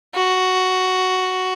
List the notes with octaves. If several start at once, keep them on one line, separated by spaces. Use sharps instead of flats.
F#4